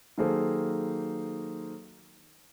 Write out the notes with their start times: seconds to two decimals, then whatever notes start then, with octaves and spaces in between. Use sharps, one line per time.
0.18 D#3 F#3 A#3 G#4 A4 C5